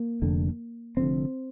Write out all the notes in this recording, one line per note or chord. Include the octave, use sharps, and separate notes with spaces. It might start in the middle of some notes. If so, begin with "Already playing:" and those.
Already playing: A#3
F1 F2 D3
F1 F2 D3 C4